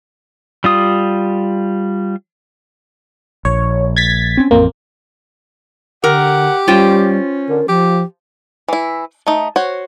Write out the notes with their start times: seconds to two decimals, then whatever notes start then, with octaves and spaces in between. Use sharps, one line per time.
0.64 G3 F4 D#6
3.45 A#1 C#5
3.96 G#6 A6 B6
4.37 C4 C#4
4.51 A1 F2 A#3 C4
6.04 D3 G4 A#4 F#5
6.68 G3 C#4 F4 C5 G5
7.49 D3 A#4
7.68 F3 G4
8.68 E3 E4
9.26 A3 D#4
9.56 F#4 C5 C#5